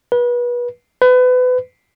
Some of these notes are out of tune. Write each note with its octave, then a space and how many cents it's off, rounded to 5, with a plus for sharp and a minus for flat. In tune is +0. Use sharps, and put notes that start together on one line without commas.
B4 -30
B4 +30